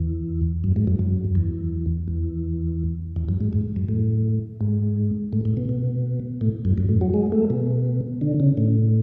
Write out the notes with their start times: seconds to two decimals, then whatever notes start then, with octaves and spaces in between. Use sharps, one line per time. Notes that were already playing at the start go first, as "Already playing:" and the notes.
Already playing: E2
0.64 F#2
0.76 G#2
0.87 F#2
0.99 F#2
1.35 E2
2.08 E2
3.16 E2
3.28 F#2
3.41 G#2
3.53 G#2
3.76 F#2
3.89 A2
4.61 G#2
5.33 A2
5.45 A2
5.57 B2
5.69 B2
6.41 A2
6.65 F#2
6.78 F#2
6.89 A2
7.01 F#3
7.14 G#3
7.32 A3
7.50 B2
8.21 D3
8.40 C#3
8.57 A2